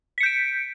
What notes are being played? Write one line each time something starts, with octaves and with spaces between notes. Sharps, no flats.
G6 B6 C#7 D7